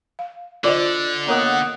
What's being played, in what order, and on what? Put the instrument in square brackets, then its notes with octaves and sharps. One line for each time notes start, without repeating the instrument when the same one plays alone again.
[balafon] F5
[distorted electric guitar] D3 [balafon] F4 C5 [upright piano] D5 D#5
[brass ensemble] A#3 D#5 F#5 [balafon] B3 A#4 A#5 [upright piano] C#5 D#6